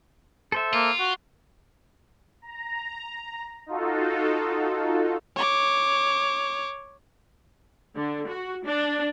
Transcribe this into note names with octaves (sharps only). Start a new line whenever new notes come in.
A4 C5 E5
A#3 F4
F#4
A#5
D#4 F4 F#4 A4
C#5 D6
D3
F#4
D4